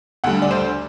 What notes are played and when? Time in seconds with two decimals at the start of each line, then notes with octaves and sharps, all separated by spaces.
0.24 D2 D3 G3 F#5
0.42 D5
0.51 C5